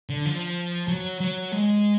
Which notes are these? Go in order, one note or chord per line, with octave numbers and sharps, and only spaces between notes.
D3
F3
F#3
F#3
G#3